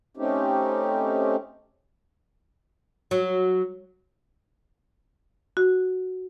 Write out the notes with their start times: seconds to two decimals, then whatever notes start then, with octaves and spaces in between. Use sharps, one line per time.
0.17 A3 C4 C#4 D#4 G4
3.11 F#3
5.57 F#4